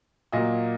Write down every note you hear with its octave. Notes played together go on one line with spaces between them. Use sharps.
A#2 F#3 A#3 D#5